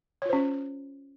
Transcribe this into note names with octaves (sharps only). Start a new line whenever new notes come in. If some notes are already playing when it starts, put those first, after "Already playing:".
C#4 F4 C5 C#5